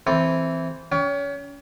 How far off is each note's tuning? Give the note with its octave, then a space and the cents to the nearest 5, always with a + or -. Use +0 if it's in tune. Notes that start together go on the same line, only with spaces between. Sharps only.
E3 +0 C4 +0 A4 +0
C#4 +30 G5 +20